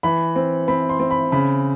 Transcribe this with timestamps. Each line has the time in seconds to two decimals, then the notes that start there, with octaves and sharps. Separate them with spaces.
0.03 E3 B5
0.36 C4
0.68 C4 B5
0.89 C6
1.00 C4
1.11 B5
1.32 C#3 B5